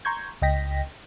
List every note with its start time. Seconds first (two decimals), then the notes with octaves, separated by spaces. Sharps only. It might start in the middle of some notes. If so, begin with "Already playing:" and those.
0.05 A#5 C6 C#6 G6 G#6
0.42 C#2 D#5 G5 A#6 B6